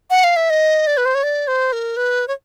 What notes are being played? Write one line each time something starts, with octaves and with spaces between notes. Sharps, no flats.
F#5
F5
E5
D#5
D5
B4
C5
C#5
D5
C5
A#4
B4
C#5